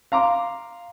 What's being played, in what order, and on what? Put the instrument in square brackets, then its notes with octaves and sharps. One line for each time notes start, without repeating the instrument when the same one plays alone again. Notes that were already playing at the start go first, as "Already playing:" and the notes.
[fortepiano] F5 A#5 C6 D6